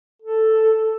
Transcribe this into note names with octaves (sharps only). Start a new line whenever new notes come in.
A4